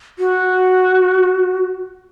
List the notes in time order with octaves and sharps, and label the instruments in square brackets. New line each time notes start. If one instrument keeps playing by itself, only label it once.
[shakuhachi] F#4